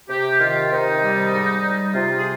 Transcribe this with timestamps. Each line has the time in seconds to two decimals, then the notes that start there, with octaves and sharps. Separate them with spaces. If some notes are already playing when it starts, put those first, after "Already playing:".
0.09 C3 G4
0.40 D#3 F4
0.72 C3 D#4
1.02 G3
1.34 G#2
1.63 G3
1.94 C3 F4
2.19 G#4